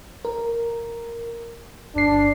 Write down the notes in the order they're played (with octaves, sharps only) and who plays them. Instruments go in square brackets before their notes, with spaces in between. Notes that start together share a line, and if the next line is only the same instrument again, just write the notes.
[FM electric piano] A#4
[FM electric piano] G1 C7 [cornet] D4